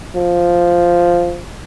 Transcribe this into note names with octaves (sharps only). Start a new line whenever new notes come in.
F3